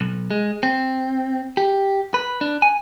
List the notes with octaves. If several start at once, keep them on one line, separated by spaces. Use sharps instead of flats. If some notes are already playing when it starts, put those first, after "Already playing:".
B1
G#3
C4
G4
B4
D4
G#5